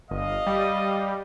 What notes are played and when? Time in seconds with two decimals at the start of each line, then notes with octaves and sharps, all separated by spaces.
0.11 G1 D#5 F5
0.47 G3